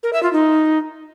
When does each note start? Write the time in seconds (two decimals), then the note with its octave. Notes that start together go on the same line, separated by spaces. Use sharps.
0.03 A#4
0.13 E5
0.23 F4
0.33 D#4